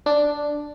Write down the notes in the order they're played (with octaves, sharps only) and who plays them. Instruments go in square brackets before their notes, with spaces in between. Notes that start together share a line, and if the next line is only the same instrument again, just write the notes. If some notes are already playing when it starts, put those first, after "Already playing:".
[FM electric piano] D4